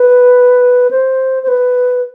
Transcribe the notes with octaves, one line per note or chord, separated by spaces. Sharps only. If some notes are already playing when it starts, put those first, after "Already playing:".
Already playing: B4
C5
C5
B4